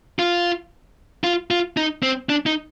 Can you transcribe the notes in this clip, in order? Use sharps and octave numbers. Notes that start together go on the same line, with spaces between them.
F4
F4
F4
D#4
C4
D4
D#4